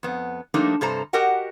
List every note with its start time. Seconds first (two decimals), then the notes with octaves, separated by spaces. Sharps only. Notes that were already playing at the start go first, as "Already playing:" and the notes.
0.03 F2 B3
0.54 F3 G3 A3 A#3 D4 D#4
0.81 G2 C3 A4 C5 A#5
1.13 F#4 G4 A#4 D#5 F#5 G5